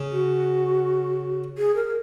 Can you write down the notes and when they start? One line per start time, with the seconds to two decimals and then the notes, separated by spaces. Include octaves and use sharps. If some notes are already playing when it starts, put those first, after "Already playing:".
Already playing: C#3 C#4
0.12 F#4
1.58 G#4
1.76 A#4